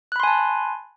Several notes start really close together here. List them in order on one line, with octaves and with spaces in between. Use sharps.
F#6 B5 C6 G#5 A5